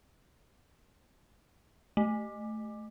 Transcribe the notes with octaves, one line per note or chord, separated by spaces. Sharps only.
A3